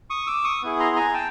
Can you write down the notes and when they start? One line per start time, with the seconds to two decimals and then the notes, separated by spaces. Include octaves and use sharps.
0.10 C#6 D#6
0.27 D6 E6
0.44 C#6 D#6
0.62 B3 E4 G#4
0.80 A#5 C6
0.96 G#5 A#5
1.14 G5 A5